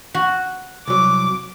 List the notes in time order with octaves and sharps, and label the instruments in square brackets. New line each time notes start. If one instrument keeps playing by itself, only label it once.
[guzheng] F#4
[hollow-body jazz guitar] C2 F#3 [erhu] D6